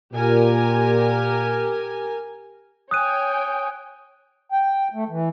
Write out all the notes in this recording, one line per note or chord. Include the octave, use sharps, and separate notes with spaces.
A#2 G4 A#4 G#5
C#5 G5 G#5 D#6 F#6 D#7
G5
A3
E3